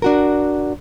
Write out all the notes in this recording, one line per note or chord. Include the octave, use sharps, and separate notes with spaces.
D4 F#4 A#4